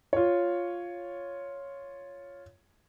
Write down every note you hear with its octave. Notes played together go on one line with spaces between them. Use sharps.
F4 C#5